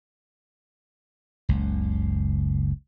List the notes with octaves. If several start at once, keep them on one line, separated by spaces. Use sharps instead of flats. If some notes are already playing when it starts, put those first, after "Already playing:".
F#1 C#2